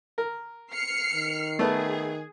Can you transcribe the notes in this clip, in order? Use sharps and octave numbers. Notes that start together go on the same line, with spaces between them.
A#4
F6 C7 C#7
D#3
A3 B3 G#4